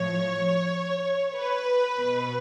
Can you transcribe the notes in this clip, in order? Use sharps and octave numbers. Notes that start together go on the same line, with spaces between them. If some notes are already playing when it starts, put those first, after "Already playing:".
Already playing: A2 F3 C#5
B4
B2